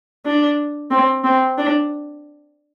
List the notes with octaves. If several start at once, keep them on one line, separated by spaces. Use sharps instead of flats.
D4
C4
C4
D4